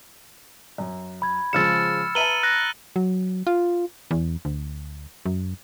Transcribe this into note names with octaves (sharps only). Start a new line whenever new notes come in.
F#2
B5 G#6
C#3 F3 G#3 E6 F6 A6 C#7 E7
B4 E5 A5 A#5 D#7 F#7 G7
F#6 A#6
F#3
F4
E2
D2
F#2